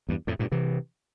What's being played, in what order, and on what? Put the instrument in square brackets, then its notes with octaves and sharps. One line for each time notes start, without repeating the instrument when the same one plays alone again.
[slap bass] E2 G2
F2 A2
G2 A#2
C3 E3